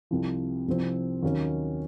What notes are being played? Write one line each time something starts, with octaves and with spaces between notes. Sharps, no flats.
C2 C3 F3
C2 C3 F3 C4
D#2 D#3 F#3 C#4